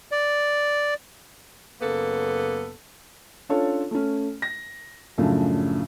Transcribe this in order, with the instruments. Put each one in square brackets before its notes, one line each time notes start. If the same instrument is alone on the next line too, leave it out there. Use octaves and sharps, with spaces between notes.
[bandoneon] D5
[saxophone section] F#2 C#3 A#3 B3 A4
[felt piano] C#4 D4 F4 A4 C#5
A3 C#4
A#6
F#2 A2 C#3 F3 D4